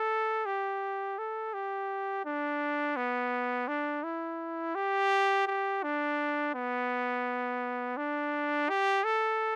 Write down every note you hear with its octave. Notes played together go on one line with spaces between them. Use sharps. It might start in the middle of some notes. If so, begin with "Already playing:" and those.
Already playing: A4
G4
A4
G4
D4
B3
D4
E4
G4
G4
D4
B3
D4
G4
A4